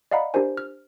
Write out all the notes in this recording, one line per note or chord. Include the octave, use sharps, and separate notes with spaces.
D5 D#5 F5 F#5 A#5 B5
D4 G4 A#4 C5 G#5
F6